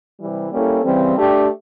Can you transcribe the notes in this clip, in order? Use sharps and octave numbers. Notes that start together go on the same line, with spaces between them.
C3 E3 G3
G3 A#3 C#4 E4 A4
C#3 E3 G3 C4
A3 D4 G4